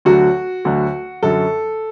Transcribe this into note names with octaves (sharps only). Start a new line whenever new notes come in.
D2 D3 F#3 F#4
D2 D3 F#3
F#2 D3 F#3 A4